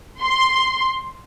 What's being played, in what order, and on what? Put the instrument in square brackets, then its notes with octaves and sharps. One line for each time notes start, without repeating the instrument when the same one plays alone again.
[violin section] C6